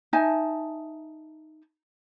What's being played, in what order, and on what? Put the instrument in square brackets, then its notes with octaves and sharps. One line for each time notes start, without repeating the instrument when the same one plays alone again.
[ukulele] D#4 E5 G#5 A5